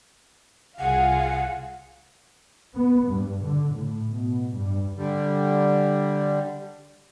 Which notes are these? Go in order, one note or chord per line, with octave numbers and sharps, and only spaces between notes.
C2 F4 G#4 F5 F#5
B3
G2
D3
A2
B2
G2
D3 G3